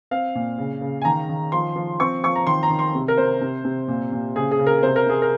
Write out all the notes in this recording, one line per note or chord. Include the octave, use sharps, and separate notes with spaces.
C4 F5
A#2
C#3
C#3
G#5
D#3 A#5
D#3
F3 C6
F3
C4 C#6
F3 C#6
A#5
D#3 C6
A#5
D#3
C6
C3
A#4
C3 C5
C3
C3
A#2
A#2
C#3 G#4
G#4
C#3
A#4
C3 C5
A#4
C3 G#4
A#4